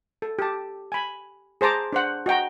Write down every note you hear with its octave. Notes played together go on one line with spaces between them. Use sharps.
A4
G4 A5
G#5 B5
G#4 C5 A5 A#5 D6
D4 C5 F#5
F#4 D#5 G5 A#5